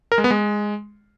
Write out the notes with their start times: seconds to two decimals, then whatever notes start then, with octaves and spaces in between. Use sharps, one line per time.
0.12 A#4
0.18 G#3
0.24 B3
0.30 G#3